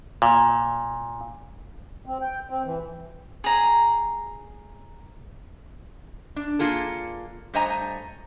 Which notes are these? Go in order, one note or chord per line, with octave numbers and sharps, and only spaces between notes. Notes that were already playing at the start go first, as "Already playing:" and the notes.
A#2
C4
G5
C4
E3
G#4 A#5
D4
A#3 F4 G#4 A4
G2 A3 C5 D#5 G#5 A#5